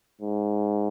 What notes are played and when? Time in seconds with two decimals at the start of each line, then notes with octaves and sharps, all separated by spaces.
0.21 G#2